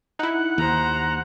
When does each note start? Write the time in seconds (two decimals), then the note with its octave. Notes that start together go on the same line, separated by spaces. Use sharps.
0.19 D#4 E4 F#5
0.58 D#2 C5 A#5